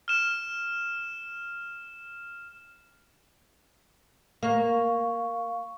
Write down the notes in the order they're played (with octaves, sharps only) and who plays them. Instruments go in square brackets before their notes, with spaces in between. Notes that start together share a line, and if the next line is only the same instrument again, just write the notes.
[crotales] F6 E7
[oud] A#3 [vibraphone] F5 C#6